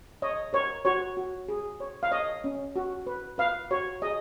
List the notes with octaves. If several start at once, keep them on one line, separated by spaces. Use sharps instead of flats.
C#5 D#5
A#4 C#5
F#4 C#5
F#4
G#4
C#5
F5
C#5 D#5
C#4
F#4
B4
B4 F5
F#4 C#5
G#4 D#5